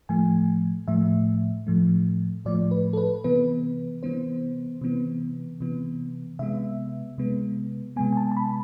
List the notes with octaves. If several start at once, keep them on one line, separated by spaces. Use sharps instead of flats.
A2 F3 A3 G#5
A2 F3 A3 E5
A2 F3 A3
A2 F3 A3 D5
B4
A4
B4
C3 E3 B3 B4
C3 E3 B3 C5
C3 E3 B3
C3 E3 B3
C3 G#3 B3 E5
C3 G#3 B3
C3 G#3 B3 G#5
G#5
A5
A5
B5